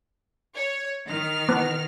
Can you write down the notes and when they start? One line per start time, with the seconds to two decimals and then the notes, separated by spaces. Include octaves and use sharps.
0.53 C#5
1.09 D#3 F6
1.49 B3